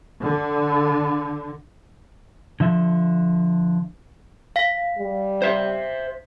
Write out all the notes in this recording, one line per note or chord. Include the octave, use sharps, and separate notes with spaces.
D3
D3 F3 E5
F5 B6
G3
C5 E5